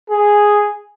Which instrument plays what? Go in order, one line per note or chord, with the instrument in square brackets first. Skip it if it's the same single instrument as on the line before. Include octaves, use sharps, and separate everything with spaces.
[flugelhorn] G#4